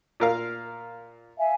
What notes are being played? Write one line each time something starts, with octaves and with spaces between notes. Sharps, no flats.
A#2 A#4 F5
E5 F5 G#5